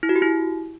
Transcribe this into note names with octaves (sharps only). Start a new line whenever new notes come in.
E4
F#4
G4
E4